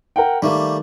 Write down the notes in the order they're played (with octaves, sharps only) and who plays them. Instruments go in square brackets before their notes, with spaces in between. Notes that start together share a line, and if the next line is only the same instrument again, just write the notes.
[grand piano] A#4 F#5 G5
[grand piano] D#3 [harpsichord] G3 A3 A#3